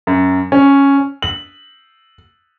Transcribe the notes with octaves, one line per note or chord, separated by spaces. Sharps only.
F#2
C#4
F#7